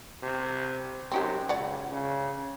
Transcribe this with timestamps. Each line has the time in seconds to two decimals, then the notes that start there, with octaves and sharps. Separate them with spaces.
0.23 C3
1.12 F#2 C4 D#4 G4
1.49 C#2 C#5 D5 F#5
1.91 C#3